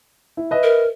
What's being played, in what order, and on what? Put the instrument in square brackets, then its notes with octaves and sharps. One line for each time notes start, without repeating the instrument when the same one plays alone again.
[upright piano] E4
B4 D#5 E5
[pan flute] A#4